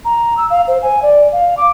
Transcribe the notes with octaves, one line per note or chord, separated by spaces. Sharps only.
A#5
E6
F5
C5
G#5
D5
F5
D6